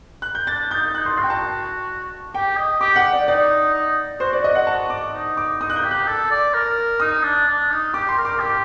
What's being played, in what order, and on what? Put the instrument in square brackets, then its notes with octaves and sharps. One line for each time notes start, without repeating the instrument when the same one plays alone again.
[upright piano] F#6
G6
[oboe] D4 [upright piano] A6
[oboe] D#4 [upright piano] G6
[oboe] D#4 [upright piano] F#6
[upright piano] C6
[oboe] F#4 [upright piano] C6
[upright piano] G5
A5
[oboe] G4 [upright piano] G5
[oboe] D#5
[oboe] G4 [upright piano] D6
[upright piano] F#5
D5
[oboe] D#4 [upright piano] D5
[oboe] D#4
[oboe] F#4 [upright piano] C5
[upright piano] D5
D#5
F#5
A5
D6
[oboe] D#4
[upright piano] D6
[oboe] D#4 [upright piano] D#6
[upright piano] F#6
G6
[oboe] G4
[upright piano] F#6
[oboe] A4
D5
A#4
[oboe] D#4 [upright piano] D#6
[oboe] D4
D4
D#4
[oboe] G4 [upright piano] D6
[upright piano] C6
[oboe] A#4
[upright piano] D6
[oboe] G4 [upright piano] D6